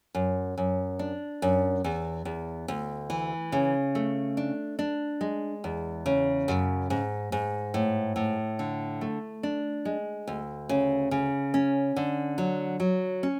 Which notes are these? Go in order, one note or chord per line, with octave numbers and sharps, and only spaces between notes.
F#2
F#2
D4
F#2
E2
E2
D2
E3
C#3
A3
D4
D4
G#3
E2
C#3
F#2
G#2
G#2
A2
A2
D3
A3
D4
G#3
D2
C#3
C#3
C#4
D3
F#3
F#3
C#4